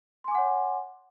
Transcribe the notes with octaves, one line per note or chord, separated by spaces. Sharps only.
C#5 F#5 G#5 C6 D6